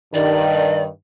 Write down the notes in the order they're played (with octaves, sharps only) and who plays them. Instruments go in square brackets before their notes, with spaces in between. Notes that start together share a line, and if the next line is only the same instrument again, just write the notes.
[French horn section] G2 D#3 [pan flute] D5